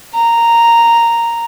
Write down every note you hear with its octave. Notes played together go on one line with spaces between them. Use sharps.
A#5